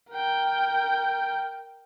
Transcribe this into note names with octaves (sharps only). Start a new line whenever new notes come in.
A#4 G5